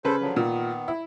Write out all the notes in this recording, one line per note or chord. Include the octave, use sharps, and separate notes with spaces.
C#3 A4 B4 C5
D3 F3 F#3
A#2 D#3 B3
E4